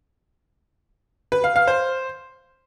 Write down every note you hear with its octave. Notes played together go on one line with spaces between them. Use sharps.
B4
F5
F5
C5